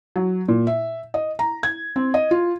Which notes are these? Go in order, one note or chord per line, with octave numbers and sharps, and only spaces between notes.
F#3
A#2
E5
D#5
A#5
G#6
C4
D#5
F4